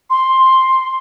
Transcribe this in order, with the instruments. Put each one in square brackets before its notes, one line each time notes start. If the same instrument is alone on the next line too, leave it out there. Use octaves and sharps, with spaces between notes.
[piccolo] C6